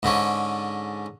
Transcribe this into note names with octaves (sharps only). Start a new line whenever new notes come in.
G#2 D3 C#4